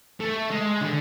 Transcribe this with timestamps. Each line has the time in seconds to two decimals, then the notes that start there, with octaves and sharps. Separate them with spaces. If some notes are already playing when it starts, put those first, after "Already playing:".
0.20 A3
0.51 G#3
0.81 D3